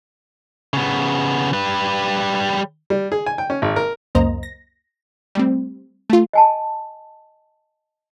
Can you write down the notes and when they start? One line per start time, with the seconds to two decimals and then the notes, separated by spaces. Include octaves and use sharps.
0.74 C#3 B3
1.53 G3 B4
2.90 G3
3.12 G#4
3.26 G#5
3.38 G5
3.50 C#4
3.62 G#1
3.76 A#4
4.15 C#2 F#2 A#3 C5 D#5 A#5
4.43 A#6
5.35 G3 A3 C4
6.10 A3 F4
6.33 D#5 G#5 A5